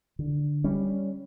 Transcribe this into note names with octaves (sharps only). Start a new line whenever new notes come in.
D3
G3 C#4